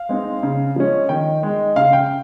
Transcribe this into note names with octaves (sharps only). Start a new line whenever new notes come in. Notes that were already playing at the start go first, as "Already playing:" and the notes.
Already playing: F5
G#3 C4 D#4
C#3
F3 G#3 C#4
D#3 G5
G#3 D#4
C#3 F5
G5